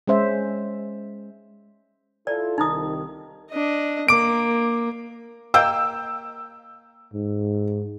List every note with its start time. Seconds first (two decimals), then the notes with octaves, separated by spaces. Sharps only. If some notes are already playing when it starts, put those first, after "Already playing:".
0.07 G#3 C#4 C5 E5
2.27 E4 F4 A4 D5
2.58 C2 D#3 D#4 E4 D#6
3.50 D4 D#5
4.08 A#3 D6 D7
5.54 A#3 D#5 G5 E6
7.14 G#2